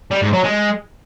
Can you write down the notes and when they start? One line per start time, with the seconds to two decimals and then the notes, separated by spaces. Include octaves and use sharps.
0.11 G3
0.22 G#2
0.33 F#3
0.44 G#3